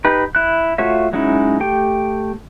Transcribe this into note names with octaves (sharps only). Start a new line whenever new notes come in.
D#4 G4 B4
E4 F#6
A3 F4 F#4 C#5 E5
F#3 G#3 C#4 D#4 E4
A3 G4 G5